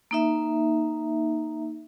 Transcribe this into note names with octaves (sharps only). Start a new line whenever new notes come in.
A#3 D#4 E5